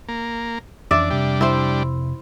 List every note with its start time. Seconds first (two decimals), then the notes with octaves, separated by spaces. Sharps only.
0.09 A#3
0.91 F2 E3 C#4 D4 D5 E5
1.10 F2 C3 G3 D4
1.41 E4 C5